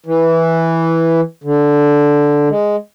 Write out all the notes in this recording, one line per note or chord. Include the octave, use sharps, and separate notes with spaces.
E3
D3
G#3